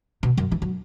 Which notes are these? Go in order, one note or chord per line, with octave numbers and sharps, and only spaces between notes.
B2
F#2
E3
F#3